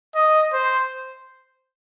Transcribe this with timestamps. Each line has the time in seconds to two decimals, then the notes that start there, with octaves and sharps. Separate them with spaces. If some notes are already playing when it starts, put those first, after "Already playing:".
0.15 D#5
0.53 C5